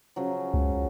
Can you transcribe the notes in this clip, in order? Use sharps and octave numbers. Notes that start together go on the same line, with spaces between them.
C#3 F3 F#3
C#2